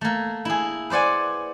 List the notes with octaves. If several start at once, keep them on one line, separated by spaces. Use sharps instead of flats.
A3 A#3
E4 G#4
B4 C5 D5 F#5 G#5